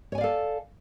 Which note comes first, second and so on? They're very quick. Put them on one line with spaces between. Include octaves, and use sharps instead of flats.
C#5 G#5 D5 F5 A4